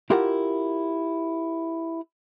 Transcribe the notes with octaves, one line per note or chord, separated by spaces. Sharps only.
E4 F4 G4 A#4 F#5